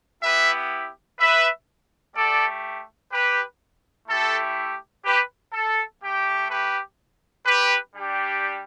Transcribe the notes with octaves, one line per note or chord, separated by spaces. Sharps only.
B3 E4 G4 B4 E5
B4 E5
A3 G4 A4 D5
G4 B4
A3 E4 G4 A4
G4 B4
A4
A3 G4
G4 B4
G4 B4
G3 D4 G4